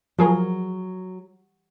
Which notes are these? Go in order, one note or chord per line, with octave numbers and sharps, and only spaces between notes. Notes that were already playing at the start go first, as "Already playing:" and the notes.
F3 F#3 G#4 A#4